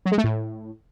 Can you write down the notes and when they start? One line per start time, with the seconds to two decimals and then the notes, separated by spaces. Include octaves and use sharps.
0.06 F#3
0.12 G#3
0.18 A3
0.24 A2